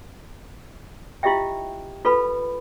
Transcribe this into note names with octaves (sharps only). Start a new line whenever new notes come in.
E4 F4 G4 D#5 E5 G5
F4 A4 B4 B5